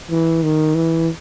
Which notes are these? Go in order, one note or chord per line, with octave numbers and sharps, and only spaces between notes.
E3
D#3
E3